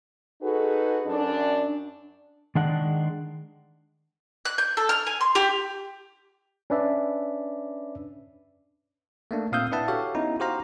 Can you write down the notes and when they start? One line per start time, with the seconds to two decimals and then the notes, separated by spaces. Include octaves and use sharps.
0.42 D#4 F#4 G#4 A4 B4
1.06 F#2 D4
2.55 D#3 G#3 D4 F#5
4.45 F#6
4.58 G6
4.77 A4
4.89 F6
5.07 G#5
5.21 C6
5.35 G4
6.70 C#4 D4 B4 D5 E5
9.31 A3 A#3 D4
9.52 A#2 C4 F5 D#6 E6 G6
9.72 D4 E4 B4 E5 F#5 A5
9.88 F#4 G4 A4 C#5 F5
10.15 B3 C#4 D#4 E4
10.40 F#4 G4 C5 F5 A#5